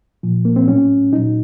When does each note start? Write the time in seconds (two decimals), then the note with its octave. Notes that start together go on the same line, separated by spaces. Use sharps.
0.23 A#2 F3
0.45 A#3
0.56 C4
0.68 A2 F#3 C#4
1.12 A#2 F#3 D#4